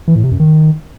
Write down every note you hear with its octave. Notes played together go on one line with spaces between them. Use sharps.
E3
A2
C3
F#2
D#3